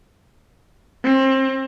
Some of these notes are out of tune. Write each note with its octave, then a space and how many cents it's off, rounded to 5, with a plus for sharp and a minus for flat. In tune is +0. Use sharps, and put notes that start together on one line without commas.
C4 +30